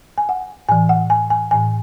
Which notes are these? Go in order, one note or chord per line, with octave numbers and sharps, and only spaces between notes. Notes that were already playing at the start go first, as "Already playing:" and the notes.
G#5
F#5
A2 E3 G#5
F#5
G#5
G#5
A2 E3 G#5